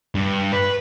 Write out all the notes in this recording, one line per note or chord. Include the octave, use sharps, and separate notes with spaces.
G2
B4